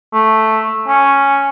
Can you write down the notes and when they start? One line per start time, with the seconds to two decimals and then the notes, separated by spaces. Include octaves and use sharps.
0.13 A3
0.88 C#4